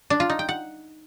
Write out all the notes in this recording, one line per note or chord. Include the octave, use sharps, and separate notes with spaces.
D4
F4
D#4
G5
F#5